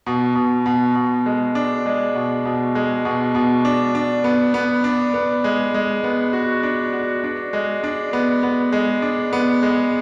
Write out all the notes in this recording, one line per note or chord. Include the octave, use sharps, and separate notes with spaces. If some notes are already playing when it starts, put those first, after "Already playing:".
B2
B2
B2
B2
G#3
D4
G#3
B2
B2
G#3
B2
B2
D4
D4
B3
B3
D4
B3
G#3
G#3
B3
F#4
D4
F#4
D4
G#3
D4
B3
B3
G#3
D4
B3
G#3